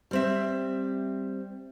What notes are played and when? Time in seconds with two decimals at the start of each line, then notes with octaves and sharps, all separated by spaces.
0.11 G3 C4 E5